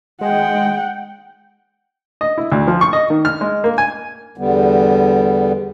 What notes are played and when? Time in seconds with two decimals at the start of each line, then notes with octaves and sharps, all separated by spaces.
0.21 G#3 F#5 G5
2.21 D#5
2.38 E4
2.52 D2
2.67 F3
2.81 C#6
2.93 D#5
3.10 D#3
3.25 F6
3.41 G#3
3.64 A#3
3.78 G#5
4.38 E2 D3 G3 B3